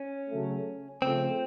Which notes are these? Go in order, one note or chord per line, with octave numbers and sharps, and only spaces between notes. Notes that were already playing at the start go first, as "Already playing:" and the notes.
Already playing: C#4
C#3 F#3 A3
C#3 F3 A3 C4